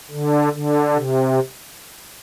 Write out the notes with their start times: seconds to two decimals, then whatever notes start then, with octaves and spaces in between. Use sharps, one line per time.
0.11 D3
0.53 D3
0.95 C3